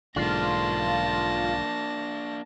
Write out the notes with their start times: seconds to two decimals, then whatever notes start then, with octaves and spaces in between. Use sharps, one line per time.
0.16 B1 G#2 D3 A#3 D4 F4 A5 A#6